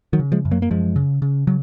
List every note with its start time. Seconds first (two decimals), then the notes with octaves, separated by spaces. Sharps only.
0.13 D#3 F#3
0.20 C#3
0.32 F3 G#3
0.45 F#2
0.51 F#3 A#3
0.62 A#3
0.71 F#2 F3 G#3
0.96 C#3
1.22 C#3
1.47 C#3 F#3